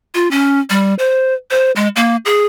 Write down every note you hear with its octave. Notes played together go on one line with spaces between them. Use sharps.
F4
C#4
G3
C5
C5
G#3
A#3
G#4